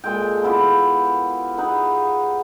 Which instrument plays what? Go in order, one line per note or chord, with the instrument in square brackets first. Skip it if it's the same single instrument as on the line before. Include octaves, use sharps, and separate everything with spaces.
[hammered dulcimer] A#2 G#3 A4 G5
B3 E4 F4 G4
B3 D#4 G#4 B4